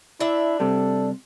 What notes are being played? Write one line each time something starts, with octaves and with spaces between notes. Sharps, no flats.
D4 E4 E5
C3 G3 A4